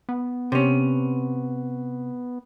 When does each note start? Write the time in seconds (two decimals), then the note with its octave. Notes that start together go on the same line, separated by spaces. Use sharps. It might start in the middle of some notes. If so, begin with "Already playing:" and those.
0.09 B3
0.52 C3 C#4